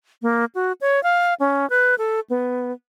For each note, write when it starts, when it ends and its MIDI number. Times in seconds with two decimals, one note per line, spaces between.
0.22 0.45 58
0.55 0.72 66
0.81 1.02 73
1.03 1.34 77
1.40 1.68 61
1.70 1.95 71
1.98 2.20 69
2.30 2.72 59